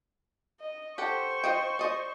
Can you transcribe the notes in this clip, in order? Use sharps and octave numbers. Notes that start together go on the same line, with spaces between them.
D#5
G4 A4 C5 F#5 C#6
F4 D#5 G5
D5 D#5